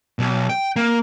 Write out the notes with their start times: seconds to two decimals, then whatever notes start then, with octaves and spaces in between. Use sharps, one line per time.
0.19 B1
0.49 G5
0.76 A#3